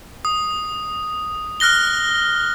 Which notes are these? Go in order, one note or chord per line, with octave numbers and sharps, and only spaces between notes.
D#6
F6 F#6 A#6 G7